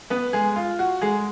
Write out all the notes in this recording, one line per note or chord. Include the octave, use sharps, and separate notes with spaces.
B3 B4
G#3 G#4
F4
F#4
G#3 G#4